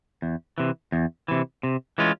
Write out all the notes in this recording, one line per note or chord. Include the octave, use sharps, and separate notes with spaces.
E2
C3 E3
E2
C3 E3
C3
E3 G#3 C#4 F4